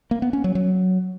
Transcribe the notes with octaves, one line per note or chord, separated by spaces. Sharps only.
A#3
B3
C#4
F#3
F#3